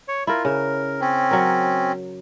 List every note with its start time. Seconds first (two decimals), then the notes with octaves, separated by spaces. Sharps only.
0.08 C#5
0.27 E4 F4 A#4
0.45 C#3 A#4
1.01 C4 C#4
1.31 F#3 A#4